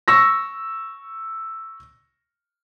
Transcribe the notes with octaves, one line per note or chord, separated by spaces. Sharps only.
C#6 E6 A#6